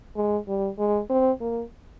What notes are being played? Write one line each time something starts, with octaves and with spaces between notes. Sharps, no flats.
G#3
G3
G#3
C4
A#3